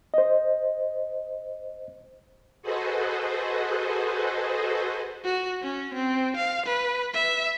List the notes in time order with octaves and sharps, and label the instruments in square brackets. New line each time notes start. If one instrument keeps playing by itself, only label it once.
[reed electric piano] C5 D#5
[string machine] F#4 G#4 A4 B4 C5 D#5
[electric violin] F#4
C#4
C4
F5
B4
E5